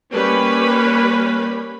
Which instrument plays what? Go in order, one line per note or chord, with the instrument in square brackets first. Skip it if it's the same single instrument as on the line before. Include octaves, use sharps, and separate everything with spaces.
[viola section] G3 A#3 C#4 G4 B4 B5